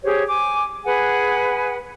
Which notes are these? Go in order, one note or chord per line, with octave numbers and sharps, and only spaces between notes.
G4 G#4 C5 C#5
G#5 D6
G#4 B4 F#5 G#5